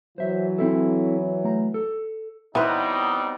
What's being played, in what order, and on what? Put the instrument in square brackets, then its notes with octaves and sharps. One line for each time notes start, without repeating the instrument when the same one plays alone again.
[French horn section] E3 F#3 [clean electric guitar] C5 E5
[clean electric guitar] C4 E4 A4
A3 A#5
A4
[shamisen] E3 [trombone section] F#3 G3 D#4 [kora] B3 C4 B4